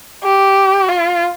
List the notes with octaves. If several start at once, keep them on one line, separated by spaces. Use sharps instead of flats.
G4
F4